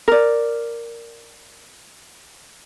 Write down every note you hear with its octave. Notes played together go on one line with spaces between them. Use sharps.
A#4 D5